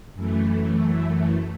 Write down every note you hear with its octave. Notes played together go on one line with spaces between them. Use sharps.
F#2 E3 A3